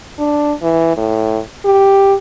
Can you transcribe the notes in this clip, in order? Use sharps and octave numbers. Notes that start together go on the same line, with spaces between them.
D4
E3
A2
G4